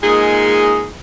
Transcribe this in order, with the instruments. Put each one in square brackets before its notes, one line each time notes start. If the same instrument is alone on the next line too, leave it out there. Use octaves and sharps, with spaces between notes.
[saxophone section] A#2 G#3 D#4 G#4